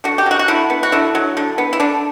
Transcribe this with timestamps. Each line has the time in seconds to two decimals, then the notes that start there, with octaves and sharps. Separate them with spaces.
0.04 D3 F#4
0.18 G4
0.26 F#3 F#4
0.39 F#4
0.48 D3 E4
0.70 B3
0.83 F#4
0.92 D3 E4
1.15 F#3
1.37 D3
1.58 B3
1.73 E4
1.80 D3 D4